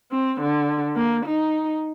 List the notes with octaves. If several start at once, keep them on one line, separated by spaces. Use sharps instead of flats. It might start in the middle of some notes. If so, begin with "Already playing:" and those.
C4
D3
A#3
D#4